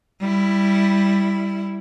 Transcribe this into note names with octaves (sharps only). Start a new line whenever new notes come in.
G3 E4